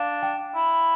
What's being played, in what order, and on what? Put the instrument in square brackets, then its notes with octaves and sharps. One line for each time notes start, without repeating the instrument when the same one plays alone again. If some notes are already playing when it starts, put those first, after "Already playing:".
Already playing: [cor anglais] D4 [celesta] F5
[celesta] G5
[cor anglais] E4